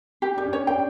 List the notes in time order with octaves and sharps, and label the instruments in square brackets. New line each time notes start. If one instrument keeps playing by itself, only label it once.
[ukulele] G4
[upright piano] D4 [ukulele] G4
[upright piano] C#4
[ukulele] C#5
[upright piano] D4 [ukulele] G5